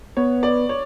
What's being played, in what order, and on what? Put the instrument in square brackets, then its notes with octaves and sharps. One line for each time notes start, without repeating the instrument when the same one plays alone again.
[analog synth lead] B3 [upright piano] C#5
[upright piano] D5
C#5